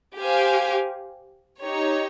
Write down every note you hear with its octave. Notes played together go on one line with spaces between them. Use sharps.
G4 C5 F5 G#5
D#4 G4 C#5